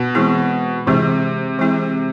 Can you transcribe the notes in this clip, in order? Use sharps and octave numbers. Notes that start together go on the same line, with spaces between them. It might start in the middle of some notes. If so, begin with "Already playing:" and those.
Already playing: B2
E3 G#3 C4 E4 G#4
C3 E3 G#3 C4 E4 G#4
E3 G#3 C4 E4 G#4